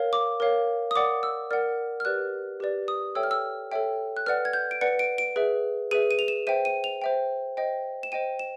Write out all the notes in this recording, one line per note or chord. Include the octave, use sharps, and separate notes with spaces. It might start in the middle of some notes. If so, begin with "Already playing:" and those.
Already playing: A#4 C#5 F5
D6
A#4 C#5 F5
D#6
A#4 D5 F#5 D6
E6
A#4 D5 F#5 F6
F6
G4 B4 D5 F#6
G4 B4 D5
D#6
A4 C#5 E5 G5 E6
F6
E6
A4 C#5 E5 G5
F#6
B4 D5 F#5 F6
G#6
G6
D7
B4 D5 F#5 C#7
D7
D7
G#4 B4 E5
G#4 B4 E5 D#7
D#7
F7
E7
C5 E5 G5 D#7
D#7
F7
C5 E5 G5
C5 D#5 G5
E7
C5 D#5 G5 D#7
E7